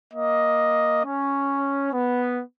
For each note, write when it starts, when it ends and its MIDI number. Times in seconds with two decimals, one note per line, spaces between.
0.12 1.01 58
0.12 1.01 75
1.04 1.90 61
1.93 2.40 59